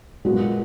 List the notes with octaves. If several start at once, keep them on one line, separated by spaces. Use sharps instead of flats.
A#2 G#3 B3 F#4